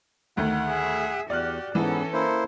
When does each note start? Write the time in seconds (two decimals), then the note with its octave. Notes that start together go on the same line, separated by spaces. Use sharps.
0.37 D2 D#3 A3 F#5
0.69 G#4 E5
1.30 E2 F#4 G4 D5 F6 F#6
1.75 G#2 E3 B3 C#4 A4
2.13 A#3 E4 C5